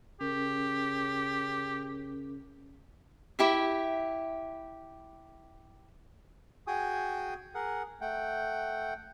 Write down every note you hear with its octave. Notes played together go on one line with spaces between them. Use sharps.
C#3 C#4 G4 A#4
E4 G4 E5
F#4 G#4 G5 G#5 D#6
G#4 A#4 F#5
A3 F#5 G5